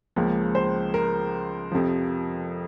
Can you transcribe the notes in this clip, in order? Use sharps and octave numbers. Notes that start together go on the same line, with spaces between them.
C#2 C#3 F3 A#3
C5
A#4
F2 C3 F3